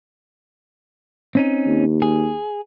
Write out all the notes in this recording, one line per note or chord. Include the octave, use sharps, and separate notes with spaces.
C4 C#4 D#4
D#2
G#4